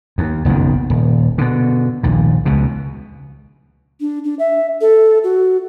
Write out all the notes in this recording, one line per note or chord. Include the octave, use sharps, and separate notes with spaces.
D#2
F#1 B1 F2 D#3
D#1
B2 D3
A#1 D#2 A#2
C#2 B2
D4
D4
E5
A4
F#4